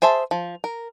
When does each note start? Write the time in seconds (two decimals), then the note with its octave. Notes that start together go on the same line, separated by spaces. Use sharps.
0.02 G#4 C5 E5 A5
0.31 F3
0.64 A#4